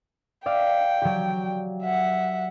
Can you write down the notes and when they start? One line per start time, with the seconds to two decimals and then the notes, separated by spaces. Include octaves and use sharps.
0.46 D5 E5 F5 G5
1.02 F#3 G4
1.83 E5 F#5